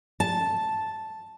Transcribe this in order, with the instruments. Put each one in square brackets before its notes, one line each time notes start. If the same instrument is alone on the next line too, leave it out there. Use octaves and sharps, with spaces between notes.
[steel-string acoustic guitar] A5